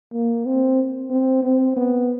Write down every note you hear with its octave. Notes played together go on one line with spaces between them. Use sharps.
A#3
C4
C4
C4
B3